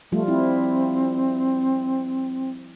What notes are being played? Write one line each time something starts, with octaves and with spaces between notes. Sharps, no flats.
F3 G3 A3 F4
C4 E4